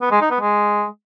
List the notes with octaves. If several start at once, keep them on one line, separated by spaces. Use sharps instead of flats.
B3
G#3
D#4
B3
G#3